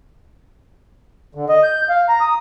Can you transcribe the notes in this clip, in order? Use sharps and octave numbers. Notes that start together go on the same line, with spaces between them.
D3
D#5
G6
F5
A#5
D#6